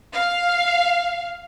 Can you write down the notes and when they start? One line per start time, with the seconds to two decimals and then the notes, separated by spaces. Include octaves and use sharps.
0.13 F5